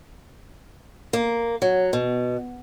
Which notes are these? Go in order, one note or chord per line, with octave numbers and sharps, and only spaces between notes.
A#3
F#3
B2